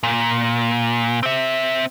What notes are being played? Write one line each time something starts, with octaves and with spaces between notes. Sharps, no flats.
A#2
C4 E5